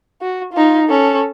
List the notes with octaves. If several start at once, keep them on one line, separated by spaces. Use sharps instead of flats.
F#4
D#4 F4
C#4 A4